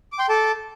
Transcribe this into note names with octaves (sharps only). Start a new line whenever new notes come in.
D6
G5 C6
A4 A5 D6